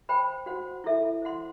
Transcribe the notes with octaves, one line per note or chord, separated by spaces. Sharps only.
C5 G5 B5
F#4 C5 F#5
E4 A4 E5
C5 F#5 C6